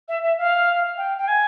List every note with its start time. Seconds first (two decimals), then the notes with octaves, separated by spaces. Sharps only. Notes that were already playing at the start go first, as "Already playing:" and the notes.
0.08 E5
0.23 E5
0.38 F5
0.97 G5
1.18 G5
1.28 G#5